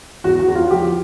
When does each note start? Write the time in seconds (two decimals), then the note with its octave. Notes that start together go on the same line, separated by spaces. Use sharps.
0.24 E2 F#4
0.40 F#4
0.48 E2
0.55 F4
0.71 F3 G4